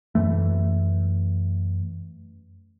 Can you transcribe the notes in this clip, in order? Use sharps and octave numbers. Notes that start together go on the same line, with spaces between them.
F#2 E3 A3